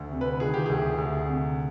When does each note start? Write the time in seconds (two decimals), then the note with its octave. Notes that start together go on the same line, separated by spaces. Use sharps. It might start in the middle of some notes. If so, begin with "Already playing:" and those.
Already playing: D2
0.11 C3
0.21 B4
0.40 D#3 G#4
0.54 G4
0.66 D2 G#4
0.98 D2
1.27 C3